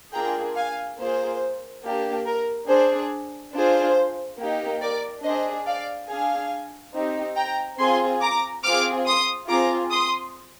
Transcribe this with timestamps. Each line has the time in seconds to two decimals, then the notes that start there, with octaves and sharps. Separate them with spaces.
0.13 A#3 D4 F4 G#4 G5 A#5
0.56 F5 G#5
0.98 A#3 F4 G#4 C5
1.83 A#3 D4 G4
2.26 A#4
2.68 D4 G#4 C5
3.54 D4 F4 G#4 C5
4.39 A#3 D#4 G4
4.81 A#4 D5
5.23 D4 G#4 C5 D#5
5.65 D5 F5
6.08 D4 G#4 F5 G#5
6.94 C4 D#4 G4
7.36 G5 A#5
7.78 C4 F4 G#4 G#5 C6
8.21 A#5 D6
8.63 C4 F4 G#4 D6 F6
9.06 C6 D#6
9.49 C4 F4 G#4 A#5 D6
9.90 C6 D#6